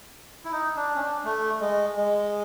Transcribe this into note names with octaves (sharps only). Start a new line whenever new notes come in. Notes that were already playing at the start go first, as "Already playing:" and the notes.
E4
D#4
D4
C#4
D4
A3
G#3
G#3